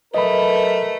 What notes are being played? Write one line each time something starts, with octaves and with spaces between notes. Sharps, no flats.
F#3 A3 A#4 B4 D#5 B5